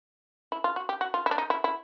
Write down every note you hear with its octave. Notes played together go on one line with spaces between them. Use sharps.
E4
F4
F#4
G4
F#4
F4
E4
D4
D#4
E4
E4